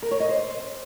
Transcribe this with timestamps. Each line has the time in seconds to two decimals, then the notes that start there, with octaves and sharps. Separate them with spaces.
0.02 A#4
0.11 C#5
0.20 D#5
0.29 C5